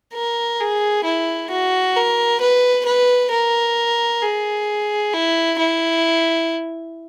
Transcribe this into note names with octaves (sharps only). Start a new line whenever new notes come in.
A#4
G#4
E4
F#4
A#4
B4
B4
A#4
G#4
E4
E4